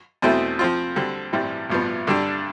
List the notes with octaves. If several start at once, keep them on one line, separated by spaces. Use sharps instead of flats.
E2 B2 A3 C4 E4
F3 C4 F4
D3 G3 C4
A1 G2 E3 G3 C4
A1 G2 F3 B3
G2 D3 G3 D4